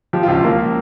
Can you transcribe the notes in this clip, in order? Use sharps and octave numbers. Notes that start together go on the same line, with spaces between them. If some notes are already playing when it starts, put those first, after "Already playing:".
F3 G4
F4
C#2
C#4
F3 A#3